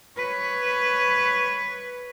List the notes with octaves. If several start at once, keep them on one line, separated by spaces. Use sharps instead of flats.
B4 C#5